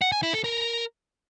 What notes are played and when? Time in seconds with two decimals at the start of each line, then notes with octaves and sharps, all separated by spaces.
0.01 F#5
0.12 G#5
0.23 E4
0.33 A4
0.44 A#4